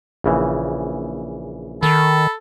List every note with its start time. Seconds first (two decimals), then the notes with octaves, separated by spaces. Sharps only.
0.24 A#1 C#3 E3
1.83 D#3 A4 B5